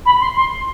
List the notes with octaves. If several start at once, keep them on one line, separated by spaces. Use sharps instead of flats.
B5
C6
C6